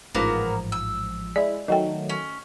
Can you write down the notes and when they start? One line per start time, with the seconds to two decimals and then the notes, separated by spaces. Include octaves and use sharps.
0.15 A1 G#2 F3 A#3 B3 A#4
0.72 E6
1.36 G#3 E4 D5
1.68 D#3 F#3 A3 D#5 G5
2.10 C#4